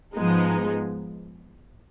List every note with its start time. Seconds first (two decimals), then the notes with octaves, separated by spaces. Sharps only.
0.14 G#2 F3 G#3 B3 D#4